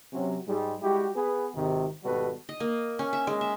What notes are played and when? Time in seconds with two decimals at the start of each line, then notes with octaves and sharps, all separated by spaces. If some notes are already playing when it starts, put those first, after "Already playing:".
0.13 C3 F#3 C#4
0.47 G#2 G3 G#3
0.83 G3 G#3 E4 F#4 G4
1.16 B3 G#4 B4
1.54 G#1 C3 D#3
2.04 G#1 B2 G3 F#4 A4 B4
2.49 D#5
2.60 A#3
2.99 C#4
3.13 E5
3.27 G#3
3.41 E5